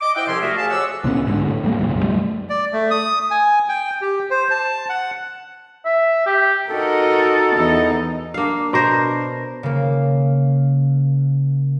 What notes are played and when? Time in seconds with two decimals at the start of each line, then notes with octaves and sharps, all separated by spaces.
0.01 D#5 D6
0.15 E4 C5 D#5 E5 F#5 G5
0.27 C2 C3 F3 C#4 A4 C6
0.42 G3 A3 F#4 A#4 D#5 E5
0.57 G#4 F5 A5
0.70 F2 G4 C#5 E5 F#5 E6
1.04 C2 A#2 B3 C#4
1.26 G#2 D3
1.48 A2
1.64 F1 G3 A#3
1.79 F#1 B1 F#2 A#2
2.03 G3 A3
2.49 D5
2.72 A3
2.91 D#6
3.31 G#5
3.69 G5
4.01 G4
4.30 C5
4.51 A5
4.89 F#5
5.85 E5
6.26 G4
6.70 D#4 F#4 A4 A#4
7.56 E2 D#4
8.34 A#3 D4 F5
8.73 B2 A#4 C5
9.63 C#3 A#3